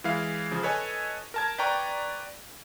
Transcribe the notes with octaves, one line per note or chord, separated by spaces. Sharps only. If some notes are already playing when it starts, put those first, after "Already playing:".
E3 G#3 E4 F5
C#3 F3
A4 B4 C#5 D#5 G#5
A#4 A5 G#6
B4 D5 G5 A#5 C#6